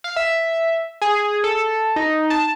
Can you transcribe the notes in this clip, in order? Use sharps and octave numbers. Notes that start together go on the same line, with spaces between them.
F5
E5
G#4
A4
D#4
A5